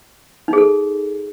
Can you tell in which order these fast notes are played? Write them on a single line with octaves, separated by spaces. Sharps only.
D#4 G#4 A4